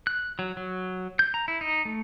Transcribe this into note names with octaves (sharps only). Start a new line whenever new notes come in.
F#6
F#3
F#3
G6
A#5
E4
D#4
A3